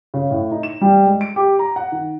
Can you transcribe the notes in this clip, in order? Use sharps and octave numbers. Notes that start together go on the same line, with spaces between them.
C#3
A2
D#4
E7
G3
G#3
D7
G4
A#5
F#5
D#3